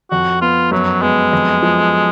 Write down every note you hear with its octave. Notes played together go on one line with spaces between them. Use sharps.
F2 F#4
B3 F4
F#2 F#3
G#3 B3
F2
F3